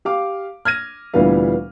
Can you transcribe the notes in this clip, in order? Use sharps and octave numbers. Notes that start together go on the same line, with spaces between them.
G4 F5 D6
F6 G#6 A#6 D#7
D2 A#2 E3 G3 B3 F5